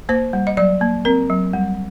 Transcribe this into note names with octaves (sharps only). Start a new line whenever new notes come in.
A#3 C5
G3
D#5
F#3 D5
A#3
C4 A#4
F#3
G3